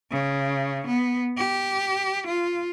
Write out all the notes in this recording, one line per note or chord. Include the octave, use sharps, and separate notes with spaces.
C#3
B3
G4
F4